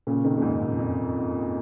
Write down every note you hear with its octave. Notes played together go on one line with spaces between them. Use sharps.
A#2 C#3
C3 D#3
A#2
F2 G#2
F#2
F2